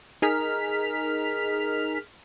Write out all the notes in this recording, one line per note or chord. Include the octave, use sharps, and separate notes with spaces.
D#4 G#4 A#4 F6 B6